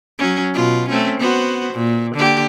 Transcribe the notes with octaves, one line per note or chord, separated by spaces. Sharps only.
F#3 C#4
B2 F4
A3 C4 C#4
B3 F#4 C5
A#2
D3 A#3 G4